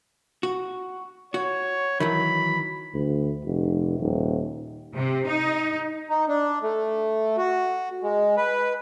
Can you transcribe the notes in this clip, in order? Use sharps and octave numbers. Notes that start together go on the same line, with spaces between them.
F#4
F#4 C#5
D#3 E3 F#3 B5
D2
F1
D#1
C3
D#4
D#4
D4
A3
F#4
G#3
B4